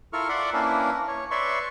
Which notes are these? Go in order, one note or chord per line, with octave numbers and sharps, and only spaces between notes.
E4 F4 A4 A#4 C#6 F6
D5 E5 F#5 C6 D6
A#3 C#4 D4 E4 A#4 B4
C#5
B4 C#5 D5 E5 C6 C#6